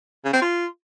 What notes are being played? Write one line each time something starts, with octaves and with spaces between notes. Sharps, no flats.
C#3
C4
F4